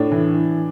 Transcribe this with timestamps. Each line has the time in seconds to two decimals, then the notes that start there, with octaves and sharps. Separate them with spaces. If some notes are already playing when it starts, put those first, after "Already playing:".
Already playing: A2 D4
0.12 E3